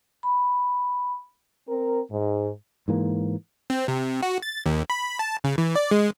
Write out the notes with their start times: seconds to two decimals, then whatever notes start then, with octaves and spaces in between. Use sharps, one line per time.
0.23 B5
1.68 C4 A#4
2.11 G#2
2.88 G#2 E3 A#3
3.70 C4
3.88 C3
4.23 F#4
4.42 A6
4.66 D#2
4.90 B5
5.19 A5
5.44 C#3
5.58 E3
5.76 D5
5.91 G#3